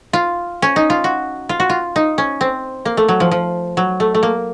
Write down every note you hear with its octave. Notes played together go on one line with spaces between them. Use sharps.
F4
C#4
D#4
F4
F#4
F4
F#4
F4
D#4
C#4
C4
A#3
A3
F#3
F3
F3
F#3
A3
A3
A#3